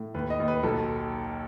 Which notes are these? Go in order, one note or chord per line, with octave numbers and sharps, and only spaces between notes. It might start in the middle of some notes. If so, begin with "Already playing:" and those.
Already playing: A2
D#2 B4
D#5
D#2
B4
B1 A4